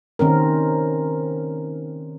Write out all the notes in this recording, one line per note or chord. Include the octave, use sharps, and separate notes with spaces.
D#3 C4 C#4 A#4